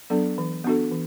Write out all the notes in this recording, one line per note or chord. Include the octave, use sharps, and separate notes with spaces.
F#3 B3 D4 A4
E3
B3 D4 F#4 A4
E3